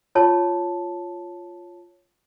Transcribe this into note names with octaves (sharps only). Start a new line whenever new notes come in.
F4 C#5 A5